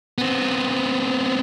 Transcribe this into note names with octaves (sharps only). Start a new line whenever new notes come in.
B3 C4